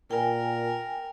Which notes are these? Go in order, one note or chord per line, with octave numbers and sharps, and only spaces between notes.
A#2 A#4 G5 G#5